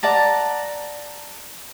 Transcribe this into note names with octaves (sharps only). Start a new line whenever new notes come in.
D5 F#5 A5 A#5